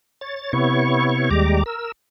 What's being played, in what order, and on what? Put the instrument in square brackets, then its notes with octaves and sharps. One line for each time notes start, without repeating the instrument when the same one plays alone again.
[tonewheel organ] C#5 A6
C3 B3 E4 C#5 C#6
D#2 G3 G#3 G4 A#5 D6
A#4 E6